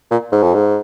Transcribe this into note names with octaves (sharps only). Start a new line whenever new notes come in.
A#2
G#2
F2
G#2